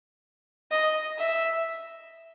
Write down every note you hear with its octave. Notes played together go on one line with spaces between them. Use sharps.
D#5
E5